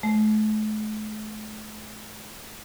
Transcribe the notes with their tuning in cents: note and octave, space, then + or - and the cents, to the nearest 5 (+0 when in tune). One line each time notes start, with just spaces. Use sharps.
A3 -40